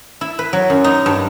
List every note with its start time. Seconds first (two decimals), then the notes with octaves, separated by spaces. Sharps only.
0.21 E4
0.39 B4
0.53 F#3
0.70 F#2
0.84 D#4
1.06 G2